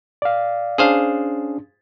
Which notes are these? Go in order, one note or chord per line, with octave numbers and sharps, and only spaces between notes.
D5 F5
C#4 D4 G#4 C5 F5